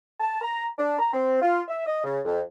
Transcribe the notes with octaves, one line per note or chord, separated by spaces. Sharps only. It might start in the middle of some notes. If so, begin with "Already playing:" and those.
A5
A#5
D4
A#5
C4
F4
E5
D#5
C#3
F2